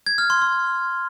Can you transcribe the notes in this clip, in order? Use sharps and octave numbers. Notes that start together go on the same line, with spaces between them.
G#6
F6
C6
C6